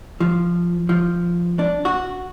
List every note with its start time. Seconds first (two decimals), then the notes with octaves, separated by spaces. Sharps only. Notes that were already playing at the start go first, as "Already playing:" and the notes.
0.20 F3
0.89 F3
1.59 D4
1.85 F#4